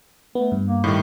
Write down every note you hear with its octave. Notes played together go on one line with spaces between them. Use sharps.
A3 B3
G2
A#3
A2 D#3 G3